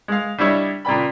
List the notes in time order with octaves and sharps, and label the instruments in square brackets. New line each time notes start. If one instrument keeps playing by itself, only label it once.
[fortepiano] G#3 F5
G3 D4 E4 C#5 D#5 E5
A#2 C#3 D5 G5 B5